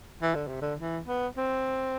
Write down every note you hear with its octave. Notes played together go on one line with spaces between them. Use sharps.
E3
D3
C3
D3
E3
B3
C4